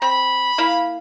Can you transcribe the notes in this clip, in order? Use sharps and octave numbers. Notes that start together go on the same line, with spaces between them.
C4 B5
A#3 E4 F5